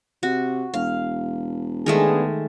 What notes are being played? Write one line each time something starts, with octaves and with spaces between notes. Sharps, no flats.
C3 F#4
E1 F5
D#3 G#3 A3 B3 D4 G#4